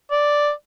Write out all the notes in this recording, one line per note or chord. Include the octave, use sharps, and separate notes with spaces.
D5